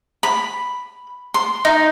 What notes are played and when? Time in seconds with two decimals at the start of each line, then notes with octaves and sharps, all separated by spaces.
0.23 B5
1.34 C6
1.65 D#4